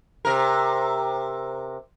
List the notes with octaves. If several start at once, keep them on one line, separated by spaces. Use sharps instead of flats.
C3 A#4